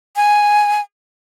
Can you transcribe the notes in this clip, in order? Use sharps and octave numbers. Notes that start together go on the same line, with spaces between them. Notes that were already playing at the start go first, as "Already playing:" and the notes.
G#5